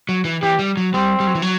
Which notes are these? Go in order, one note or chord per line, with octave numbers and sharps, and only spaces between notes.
F#3
E3
E3 G4
G3
F#3
G3 C4
G3
F#3
E3
F#3